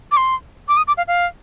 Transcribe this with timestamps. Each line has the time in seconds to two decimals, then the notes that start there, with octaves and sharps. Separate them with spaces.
0.11 D6
0.17 C6
0.68 D6
0.77 D#6
0.87 D6
0.97 F5
1.08 F5